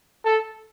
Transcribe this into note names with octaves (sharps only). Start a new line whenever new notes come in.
A4